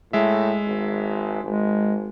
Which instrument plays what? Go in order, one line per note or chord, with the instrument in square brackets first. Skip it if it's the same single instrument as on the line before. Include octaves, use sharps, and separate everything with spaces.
[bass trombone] A2 [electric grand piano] G#3 E5
[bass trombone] G#1
[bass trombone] G#1 [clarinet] G#3